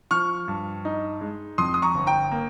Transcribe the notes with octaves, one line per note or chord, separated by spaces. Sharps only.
F3 C#6 F6
G2
D#4
G#3
F2 C6 D#6
D#6
A#5 C#6
G1
G5 A#5
A#3